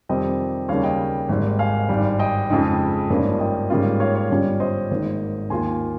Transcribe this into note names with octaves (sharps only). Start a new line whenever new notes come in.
F2 C3 D#3 G3 C4 D#5 G5
D#2 C#3 G3 A#3 C#5 F5
D#5 G5
G#1 G#2 G3 A#3
F5 G#5
G#1 G2 G3
D#5 G5
F2 C#3 G#3 D#4
G#1 G2 F3 A#3 C#4
D#5 G5
G#2 G3 A#3 C#4 F4
C#5 F5
C#5
G1 G2 G3 C#4 F4 C#5
C5 D#5
G#1 G#2 D#3 A#3 D#4
D#2 D#3 A#3 F4 G#5 C6